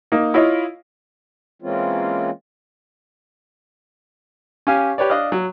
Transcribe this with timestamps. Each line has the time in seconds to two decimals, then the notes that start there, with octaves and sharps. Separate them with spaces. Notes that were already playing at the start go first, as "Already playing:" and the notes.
0.12 A#3 D#4
0.34 E4 F4 C#5 D#5 F5
1.62 E3 G#3 A#3 C4 C#4 F4
4.67 C#4 G4 F5 G#5
4.98 G4 B4 C#5 D5
5.10 D4 D#5 F5 F#6
5.32 F#3